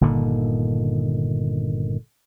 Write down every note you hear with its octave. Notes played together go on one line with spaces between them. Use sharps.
G1 A#2 D3 D#3